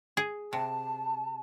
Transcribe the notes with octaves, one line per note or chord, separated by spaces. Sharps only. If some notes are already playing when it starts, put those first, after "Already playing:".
G#4
C3 A5